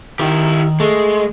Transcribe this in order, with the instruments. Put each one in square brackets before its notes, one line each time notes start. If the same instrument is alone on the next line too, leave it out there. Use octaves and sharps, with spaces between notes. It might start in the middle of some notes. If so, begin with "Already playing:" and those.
[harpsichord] D#3 [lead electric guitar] E4 G4
[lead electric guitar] G#3 [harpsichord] A3